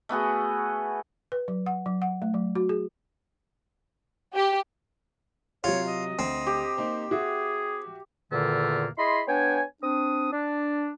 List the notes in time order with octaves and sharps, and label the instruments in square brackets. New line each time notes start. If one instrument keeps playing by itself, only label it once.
[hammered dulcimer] A3 B3 F#4 G#4
[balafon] B4
F#3
F#5
F#3
F#5
A3
F#3
F#4
G#4
[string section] G4
[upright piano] C3 F#3 [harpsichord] F4 [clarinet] C#5
[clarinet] D#5
[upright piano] D2 [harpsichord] C4
[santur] G4
[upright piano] A#3 D#4 C5
[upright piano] F#4 E5 [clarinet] G#4
[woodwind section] E2 A#2 D3 D#3 A3 A#3
E4 G#4 D#5 B5 C6
B3 D4 C#5 G5 G#5
C4 D4 D#6
D4